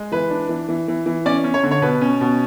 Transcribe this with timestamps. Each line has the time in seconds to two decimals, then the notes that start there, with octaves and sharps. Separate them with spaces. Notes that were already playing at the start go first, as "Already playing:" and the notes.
Already playing: G#3
0.12 E3 B4
0.30 D4
0.49 E3
0.69 E3
0.88 E3
1.06 E3
1.26 C#4 D5
1.44 C#4
1.54 C#5
1.63 D3
1.71 C#5
1.82 B2 B4
2.01 C#4
2.21 B2